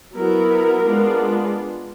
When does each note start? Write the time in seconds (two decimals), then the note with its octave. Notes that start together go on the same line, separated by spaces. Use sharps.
0.15 F#3 B3 E4 A#4
0.82 G#3 B3 D4 F4